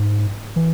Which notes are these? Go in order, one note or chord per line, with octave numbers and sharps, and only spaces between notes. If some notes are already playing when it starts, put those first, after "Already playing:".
Already playing: G#2
E3